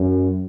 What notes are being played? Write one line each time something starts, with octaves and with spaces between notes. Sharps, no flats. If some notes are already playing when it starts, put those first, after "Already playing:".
Already playing: F#2